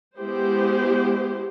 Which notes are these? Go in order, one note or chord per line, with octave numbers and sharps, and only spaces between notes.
G#3 B3 E4 G4 C5